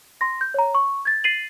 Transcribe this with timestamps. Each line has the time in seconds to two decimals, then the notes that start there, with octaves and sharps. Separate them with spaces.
0.21 C6 A#6
0.41 G6
0.54 C#5 A#5
0.75 C#6
1.05 G#6 A6
1.24 A6 C7 D#7 F#7